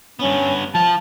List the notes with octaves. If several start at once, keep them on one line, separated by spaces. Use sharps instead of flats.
G2 B3 C#4
F3 F5 A5